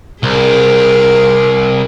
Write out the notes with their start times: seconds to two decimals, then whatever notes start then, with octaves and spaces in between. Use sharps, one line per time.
0.23 C2 G#4 A#4